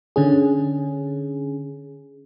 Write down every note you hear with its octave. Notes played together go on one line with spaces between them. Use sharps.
D3 C#4 G#4